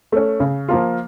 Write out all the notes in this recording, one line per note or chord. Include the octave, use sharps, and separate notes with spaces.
A3 C#4
C#3
F3 A#3 F4